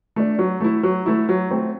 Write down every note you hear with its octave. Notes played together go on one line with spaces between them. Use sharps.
A3 D4
F#3
A3 E4
F#3
A3 E4
F#3
A3 C4